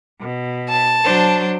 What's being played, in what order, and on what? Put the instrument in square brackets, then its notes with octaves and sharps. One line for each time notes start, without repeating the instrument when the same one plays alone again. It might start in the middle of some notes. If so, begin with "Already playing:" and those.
[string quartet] B2
[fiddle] A5
[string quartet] F#3 D4 C5